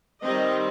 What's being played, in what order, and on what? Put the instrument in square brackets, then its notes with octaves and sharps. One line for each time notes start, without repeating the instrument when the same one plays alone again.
[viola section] D#3 G3 C4 D#5